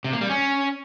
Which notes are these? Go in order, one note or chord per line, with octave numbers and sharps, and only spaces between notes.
C3
A#3
G3
C#4